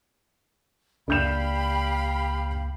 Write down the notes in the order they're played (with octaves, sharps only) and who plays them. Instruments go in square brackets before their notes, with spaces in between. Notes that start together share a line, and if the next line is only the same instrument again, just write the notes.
[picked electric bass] C#2 A#3 [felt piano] D4 G6 E7 [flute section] G4 F5 B5